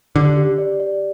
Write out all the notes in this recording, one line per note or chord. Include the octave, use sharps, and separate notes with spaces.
D3 G4
G4
D5
D5